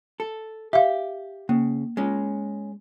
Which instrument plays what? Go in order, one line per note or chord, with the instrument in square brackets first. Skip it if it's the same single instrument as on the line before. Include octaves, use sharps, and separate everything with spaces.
[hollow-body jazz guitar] A4
[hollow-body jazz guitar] G4 [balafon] E5 F5
[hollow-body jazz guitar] C#3 [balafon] A#3
[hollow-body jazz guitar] G#3 C#4